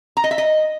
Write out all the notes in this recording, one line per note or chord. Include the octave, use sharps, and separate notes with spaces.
A#5
D#5
E5
D#5